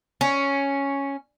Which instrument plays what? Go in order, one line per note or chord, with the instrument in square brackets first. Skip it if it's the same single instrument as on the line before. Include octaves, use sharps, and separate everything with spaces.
[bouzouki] C#4